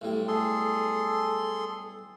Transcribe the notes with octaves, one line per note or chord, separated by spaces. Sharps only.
B1 A2 G3
G#4 A4 C6